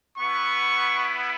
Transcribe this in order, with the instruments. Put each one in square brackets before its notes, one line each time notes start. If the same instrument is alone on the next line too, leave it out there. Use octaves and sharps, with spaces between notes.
[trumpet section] B3 E4 C#6